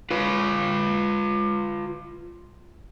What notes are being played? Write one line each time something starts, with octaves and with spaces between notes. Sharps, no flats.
F4 B4